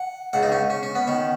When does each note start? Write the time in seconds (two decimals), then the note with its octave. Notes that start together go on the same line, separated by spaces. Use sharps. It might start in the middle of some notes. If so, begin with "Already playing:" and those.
Already playing: F#5
0.33 C#2 C#3 F#5
0.43 D#4
0.52 C#4
0.70 C#4
0.83 C#4
0.95 B3
1.07 D#3 C#4